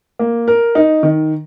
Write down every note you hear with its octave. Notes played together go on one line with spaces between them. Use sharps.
A#3
A#4
D#4
D#3